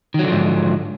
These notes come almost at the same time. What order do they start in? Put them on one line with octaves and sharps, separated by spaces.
D#3 F#3 D3 F3 G#2